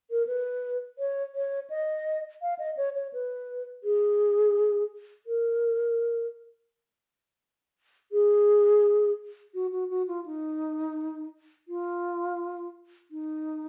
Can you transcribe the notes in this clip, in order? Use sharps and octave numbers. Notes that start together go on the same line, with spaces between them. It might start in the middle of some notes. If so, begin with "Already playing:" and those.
A#4
B4
C#5
C#5
D#5
F5
D#5
C#5
C#5
B4
G#4
A#4
G#4
F#4
F#4
F#4
F4
D#4
F4
D#4